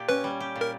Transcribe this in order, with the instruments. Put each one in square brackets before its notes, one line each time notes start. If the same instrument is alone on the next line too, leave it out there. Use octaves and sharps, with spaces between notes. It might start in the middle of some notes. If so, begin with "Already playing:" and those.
Already playing: [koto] A#2 G4
[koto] C#4 [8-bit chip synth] B4
[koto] G3
G4
A#2
[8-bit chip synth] A#4